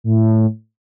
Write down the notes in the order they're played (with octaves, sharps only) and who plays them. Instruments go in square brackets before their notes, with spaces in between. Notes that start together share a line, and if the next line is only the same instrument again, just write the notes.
[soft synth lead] A2